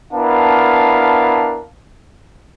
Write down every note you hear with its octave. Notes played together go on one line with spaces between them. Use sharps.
B3 D4 E4 A#4 F5 A5